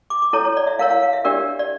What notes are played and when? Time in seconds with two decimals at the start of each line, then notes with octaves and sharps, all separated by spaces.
0.10 D6
0.22 D6
0.33 E4 A4 C#5 A#5
0.45 C#5
0.57 D5
0.67 E5
0.79 E4 A#4 C#5 F5
0.90 F5
1.03 F5
1.13 E5
1.25 D4 G4 A#4 D5
1.59 D5